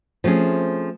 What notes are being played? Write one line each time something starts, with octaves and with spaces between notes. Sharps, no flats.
F3 A3 C4 C#4 G#4